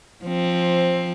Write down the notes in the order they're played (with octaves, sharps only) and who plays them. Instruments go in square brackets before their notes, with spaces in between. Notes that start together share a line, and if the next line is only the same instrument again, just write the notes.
[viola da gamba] F3 C4